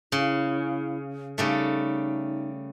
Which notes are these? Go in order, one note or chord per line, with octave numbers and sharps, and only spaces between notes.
C#3 E4
C#3 G3 A3 D#4